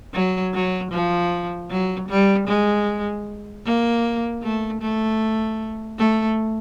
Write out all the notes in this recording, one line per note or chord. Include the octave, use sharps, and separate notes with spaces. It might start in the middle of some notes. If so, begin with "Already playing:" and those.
F#3
F#3
F3
F#3
G3
G#3
A#3
A3
A3
A3